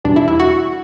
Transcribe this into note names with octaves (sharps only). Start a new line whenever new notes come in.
E2 B2 G3 D4
E4
E4
F#4